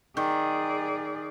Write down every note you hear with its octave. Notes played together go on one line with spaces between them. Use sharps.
D#3 G#4 D5